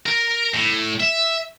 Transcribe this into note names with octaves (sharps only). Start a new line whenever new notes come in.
A#4
A2
E5